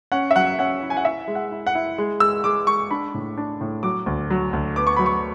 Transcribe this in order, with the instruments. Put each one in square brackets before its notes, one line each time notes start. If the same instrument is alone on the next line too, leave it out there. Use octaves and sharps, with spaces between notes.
[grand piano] C#4 F#5
E5
F#3 F#5
C#4 F#5
E4
G#5
F#5
E4 E5
G#3
F#5
E4
F#5
E4
G#3
G#3 E6
G#3 D6
G#3 C#6
D4 B5
A2
D4
A2
F#3 D6
D2
F#3
D2
B3 D6
C#6
F#3 B5
C#6